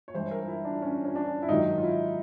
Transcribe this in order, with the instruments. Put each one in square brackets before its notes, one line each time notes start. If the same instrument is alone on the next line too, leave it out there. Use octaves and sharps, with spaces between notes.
[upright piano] C#5
G2 E3 G#3 C5
A#4
E4
D4
C#4
C#4
D4
E4
G#2 D#3 F#3 D#4
F4
E4